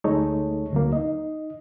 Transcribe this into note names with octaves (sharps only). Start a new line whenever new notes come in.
D2 G#3 A3 D#4 A4 C#5
D2 F#3 A#3
D#4 D#5